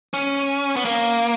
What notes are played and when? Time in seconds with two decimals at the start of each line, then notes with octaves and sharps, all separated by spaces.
0.14 C#4
0.76 B3
0.85 A#3